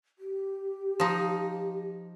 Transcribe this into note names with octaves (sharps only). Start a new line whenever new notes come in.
G4
F3 D#4